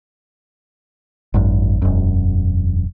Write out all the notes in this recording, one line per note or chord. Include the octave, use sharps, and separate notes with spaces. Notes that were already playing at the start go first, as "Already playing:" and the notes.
G#1 F#2
E1 F#2